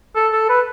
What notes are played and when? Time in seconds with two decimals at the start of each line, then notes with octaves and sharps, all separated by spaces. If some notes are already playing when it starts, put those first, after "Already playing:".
0.16 A4
0.32 A4
0.49 B4